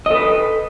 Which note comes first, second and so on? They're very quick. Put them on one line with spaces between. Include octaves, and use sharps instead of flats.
D#5 A4 B4